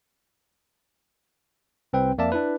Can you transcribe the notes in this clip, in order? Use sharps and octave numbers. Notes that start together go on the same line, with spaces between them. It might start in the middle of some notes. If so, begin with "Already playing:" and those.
C2 C4 B4 G5
F2 A#3 D5 E5 A5
D4 E4 B4